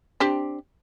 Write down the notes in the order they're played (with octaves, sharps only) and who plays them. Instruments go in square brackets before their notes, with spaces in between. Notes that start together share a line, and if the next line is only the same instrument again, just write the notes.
[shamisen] C4 D4 G4